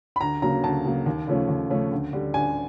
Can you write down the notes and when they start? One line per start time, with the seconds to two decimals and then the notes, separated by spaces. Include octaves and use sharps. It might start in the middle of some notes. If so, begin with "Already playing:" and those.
0.16 B5
0.21 D2 A#5
0.42 C#3 F#3 A#3 A#5
0.63 D2 A5
0.85 C#3 F#3 A#3
1.06 D#2
1.28 C#3 F3 A3 C#4
1.49 D#2
1.70 C#3 F3 A3 C#4
1.92 D2
2.13 D3 G3
2.34 D2 G#5